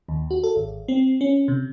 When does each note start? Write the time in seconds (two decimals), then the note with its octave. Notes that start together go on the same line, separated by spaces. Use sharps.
0.09 D#2
0.31 F#4
0.44 A4
0.56 G#1
0.88 C4
1.21 C#4
1.48 C3